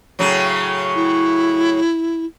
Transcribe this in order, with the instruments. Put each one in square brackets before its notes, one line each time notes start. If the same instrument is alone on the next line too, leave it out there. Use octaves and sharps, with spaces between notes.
[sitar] A2 C#3 F#3
[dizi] E4